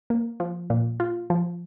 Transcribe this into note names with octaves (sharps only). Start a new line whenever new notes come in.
A#3
F3
A#2
F4
F3